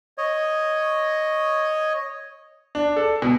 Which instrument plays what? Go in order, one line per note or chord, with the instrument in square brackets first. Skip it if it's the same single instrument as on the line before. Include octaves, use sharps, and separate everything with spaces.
[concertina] C#5 D#5
[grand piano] D4
A4
B2